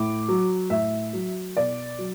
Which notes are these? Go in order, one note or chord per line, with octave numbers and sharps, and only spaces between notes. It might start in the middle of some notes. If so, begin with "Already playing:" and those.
Already playing: A2 D6
F#3
A2 E5
F#3
B2 D5
F#3